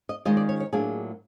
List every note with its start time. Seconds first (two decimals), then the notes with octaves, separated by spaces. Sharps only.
0.09 D#5
0.25 D#3 G#3 C#4 F4 D#5
0.37 D5
0.49 C#5
0.60 C#5
0.73 A2 F#3 A#3 D4 F4 G#4